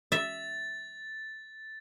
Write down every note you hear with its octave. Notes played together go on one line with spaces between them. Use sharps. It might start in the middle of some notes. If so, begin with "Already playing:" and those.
E5 A6